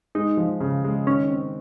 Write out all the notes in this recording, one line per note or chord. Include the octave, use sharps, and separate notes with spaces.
G#3 D#4
F3
C#3
G#3
D#3 C#4
C4